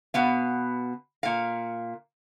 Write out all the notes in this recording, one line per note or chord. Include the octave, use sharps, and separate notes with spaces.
B2 B3 F5
A#2 F5